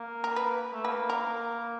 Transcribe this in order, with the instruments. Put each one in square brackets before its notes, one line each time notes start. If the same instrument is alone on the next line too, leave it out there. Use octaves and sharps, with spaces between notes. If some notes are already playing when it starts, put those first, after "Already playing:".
Already playing: [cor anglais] A#3
[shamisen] A#4
B4
[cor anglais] A3
[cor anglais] A#3 [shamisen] B4
[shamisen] A#4